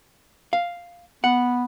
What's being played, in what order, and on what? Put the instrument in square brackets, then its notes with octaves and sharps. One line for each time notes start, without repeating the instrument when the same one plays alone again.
[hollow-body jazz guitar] F5
[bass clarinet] B3 [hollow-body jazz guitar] F#5